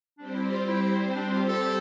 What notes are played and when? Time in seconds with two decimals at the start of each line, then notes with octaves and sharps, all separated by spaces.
0.18 G3 C4 D4 G4 C5
0.34 E4
0.51 F4
0.67 E4
1.15 D4
1.32 F4
1.49 A4